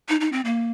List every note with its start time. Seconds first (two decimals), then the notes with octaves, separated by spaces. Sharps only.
0.09 D#4
0.21 D#4
0.32 C4
0.45 A#3